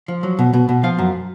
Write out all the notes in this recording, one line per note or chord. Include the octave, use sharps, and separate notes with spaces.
F3
F#3
B2
B2
B2
F3 F5
F#2